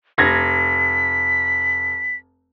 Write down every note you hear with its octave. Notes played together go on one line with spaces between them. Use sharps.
F1 G#6 A#6 B6